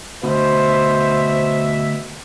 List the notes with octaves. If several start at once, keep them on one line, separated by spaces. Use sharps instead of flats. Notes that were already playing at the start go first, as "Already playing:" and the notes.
D2 B2 C5 E5